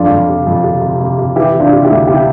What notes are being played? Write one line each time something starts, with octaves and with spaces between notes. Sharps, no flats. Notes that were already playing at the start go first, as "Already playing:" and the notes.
Already playing: F2 D4 F4
F2
C3
F2
C3
C3
C3
C3
E3 E4 G4
C3
D4 F4
C3
E4 G4
D2
C3 E4 G4